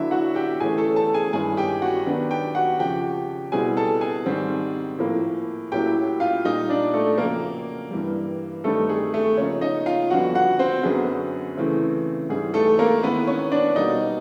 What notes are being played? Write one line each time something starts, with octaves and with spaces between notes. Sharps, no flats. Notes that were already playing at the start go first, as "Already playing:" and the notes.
Already playing: D3 F#3 B3 D4 E4 E5
F#4 F#5
G4 G5
A2 E3 A3 C#4 G#4 G#5
A4 A5
A4 A5
G#4 G#5
G2 D#3 G#3 C#4 E4 G#4 G#5
G4 G5
F#4 F#5
D#3 F#3 B3 D4
G4 G5
F#4 F#5
F2 C#3 F3 G4 G5
B2 G3 C4 E4 G#4 G#5
A4 A5
G#4 G#5
G#2 D#3 G3 C4
A2 F3 A#3
A2 F#3 A#3 C#4 E4 G4 G5
F4 F5
A#2 G3 A#3 D#4 D#5
D4 D5
A3 A4
F2 C#3 F#3 A#3 A#4
G2 E3 G3
G2 D#3 G3 A3 C4 D#4 A4
G#4
A3 A4
C#3 F3 A#3 C#4 D#4 C#5
D#4 D#5
F4 F5
F2 D3 G3 B3 F#4 F#5
F#4 F#5
C4 C5
F#2 D3 F#3 B3 G#4
C#3 E3 A3 C4
G#2 E3 G3 G#4
A3 A4
A#3 A#4
D#3 G#3 B3 C4 E4 B4
C#4 C#5
D4 D5
B2 G3 A#3 D#4 D#5